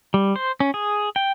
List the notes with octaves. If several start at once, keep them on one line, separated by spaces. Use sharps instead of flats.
G3
C5
C#4
G#4
G5